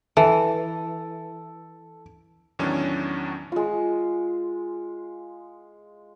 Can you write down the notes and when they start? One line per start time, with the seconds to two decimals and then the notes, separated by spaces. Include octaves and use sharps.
0.17 E3 A4
2.59 E2 A2 D#3 F#3 C#4 D4
3.52 G#3 F4